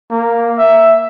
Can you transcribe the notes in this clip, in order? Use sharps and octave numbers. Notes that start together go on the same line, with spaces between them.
A#3
E5